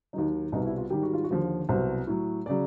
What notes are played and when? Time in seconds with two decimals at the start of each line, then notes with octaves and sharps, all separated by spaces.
0.13 D#2 D#3 F#3 D#4
0.52 C2 B2 G3 D#4
0.65 E4
0.78 F4
0.90 G#2 D#3 G3 G4
1.03 F#4
1.14 F4
1.24 F#4
1.30 D#2 D3 F3
1.69 C2 B2 F#3 C5
2.07 A2 F#3
2.46 C#3 F#3 D5